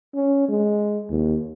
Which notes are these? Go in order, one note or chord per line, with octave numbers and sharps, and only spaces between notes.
C#4
G#3
D#2